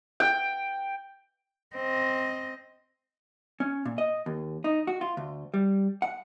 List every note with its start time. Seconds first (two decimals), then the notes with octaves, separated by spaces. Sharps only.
0.20 G5
1.75 C4 D#5
3.60 C#4
3.86 A#2
3.98 D#5
4.26 D#2
4.64 D#4
4.87 F#4
5.01 F4
5.17 D2
5.54 G3
6.02 F#5